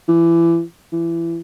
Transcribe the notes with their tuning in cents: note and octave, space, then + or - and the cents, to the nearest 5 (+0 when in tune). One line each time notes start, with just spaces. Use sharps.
E3 +25
E3 +25